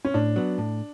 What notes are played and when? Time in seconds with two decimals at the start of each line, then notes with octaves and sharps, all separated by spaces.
0.05 C#4
0.14 A2 D4
0.36 F#3 B3
0.58 A2